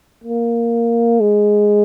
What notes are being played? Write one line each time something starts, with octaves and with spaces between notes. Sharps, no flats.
A#3
G#3